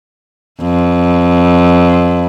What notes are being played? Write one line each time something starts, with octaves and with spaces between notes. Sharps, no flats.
F2